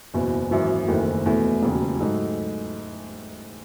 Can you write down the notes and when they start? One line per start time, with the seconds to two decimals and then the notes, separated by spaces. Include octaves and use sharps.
0.14 F#1 E2 B2
0.51 G#1 F#2 E3
0.88 F#1 E2 D#3 A3
1.26 E2 B2 A3
1.62 E1 D#2 C#3 F#3
2.00 G#2 F#3 A3 D#4 A4